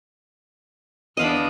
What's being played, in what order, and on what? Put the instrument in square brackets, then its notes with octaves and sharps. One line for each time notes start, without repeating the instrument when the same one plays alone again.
[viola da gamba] E2 D4 [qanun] D#5 F5 B5